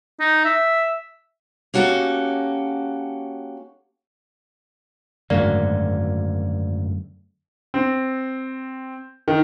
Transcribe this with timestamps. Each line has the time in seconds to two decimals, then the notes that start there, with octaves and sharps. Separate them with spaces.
0.20 D#4
0.45 E5
1.74 A#3 C#4 F#4 G4 A4
5.30 G#1 F#2 D3 A3 A#3 D5
7.74 C4
9.28 D#3